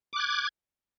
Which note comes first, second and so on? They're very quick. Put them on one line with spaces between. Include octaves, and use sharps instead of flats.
D6 F#6 G#6